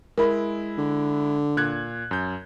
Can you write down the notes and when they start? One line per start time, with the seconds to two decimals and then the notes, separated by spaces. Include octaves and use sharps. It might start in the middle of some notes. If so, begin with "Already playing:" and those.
0.18 G#3 E4 A#4 B5
0.78 D3
1.57 A#2 F#6 G#6
2.11 F#2 G6